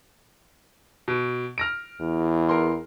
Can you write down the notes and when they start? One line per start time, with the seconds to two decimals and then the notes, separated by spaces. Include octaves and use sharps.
1.08 B2
1.58 F6 A#6 D7
2.01 E2
2.49 A#4 C6